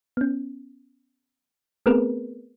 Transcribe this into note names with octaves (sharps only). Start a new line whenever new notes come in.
B3 C#4
A3 B3 C4 G#4 A#4 B4